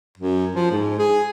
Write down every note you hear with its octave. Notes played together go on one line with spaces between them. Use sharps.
F#2
F3
G#2
G#4